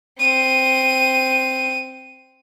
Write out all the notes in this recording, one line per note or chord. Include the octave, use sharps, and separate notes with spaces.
C4 D#7